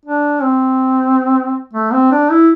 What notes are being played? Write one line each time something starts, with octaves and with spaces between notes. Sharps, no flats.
D4
C4
A3
C4
D4
E4